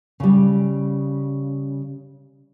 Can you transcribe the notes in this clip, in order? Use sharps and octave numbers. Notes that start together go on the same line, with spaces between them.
C#3 G3